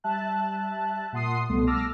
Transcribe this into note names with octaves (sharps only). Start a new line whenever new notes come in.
G3 E5 A5 F#6
A#2 F#5 C6 D#6 C7
C2 B2 G3 A3
A5 D6 E6 F6 A#6